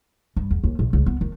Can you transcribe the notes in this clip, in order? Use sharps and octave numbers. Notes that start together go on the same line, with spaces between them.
G2
E2
D#2
A#1
C#2
B3
D#3